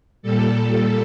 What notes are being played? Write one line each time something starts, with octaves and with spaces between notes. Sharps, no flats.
A#2 G3 A4